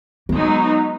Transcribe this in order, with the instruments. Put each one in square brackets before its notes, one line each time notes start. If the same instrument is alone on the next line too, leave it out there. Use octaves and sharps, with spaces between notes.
[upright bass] A#3
[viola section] F#3 B3 D#4 [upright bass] G#3